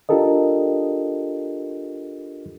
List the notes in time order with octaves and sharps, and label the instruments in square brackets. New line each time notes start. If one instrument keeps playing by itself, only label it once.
[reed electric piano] D4 F4 G4 A4 A#4 D#5